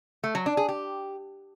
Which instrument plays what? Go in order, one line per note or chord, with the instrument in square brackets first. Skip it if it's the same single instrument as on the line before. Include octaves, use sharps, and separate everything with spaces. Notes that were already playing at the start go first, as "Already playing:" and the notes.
[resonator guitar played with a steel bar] A3
F#3
D4
G#4
G4